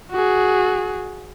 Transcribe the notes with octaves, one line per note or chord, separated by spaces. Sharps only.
F#4 G#4